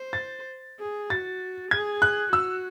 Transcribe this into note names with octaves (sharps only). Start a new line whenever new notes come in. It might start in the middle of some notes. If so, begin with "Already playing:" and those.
Already playing: C5
A6
G#4
F#4 A6
G#4 G#6
F#6
F#4 E6